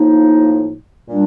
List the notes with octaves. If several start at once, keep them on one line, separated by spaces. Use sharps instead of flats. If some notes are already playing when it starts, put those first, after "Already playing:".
Already playing: A2 F3 A#3 D#4
A#2 G3 D4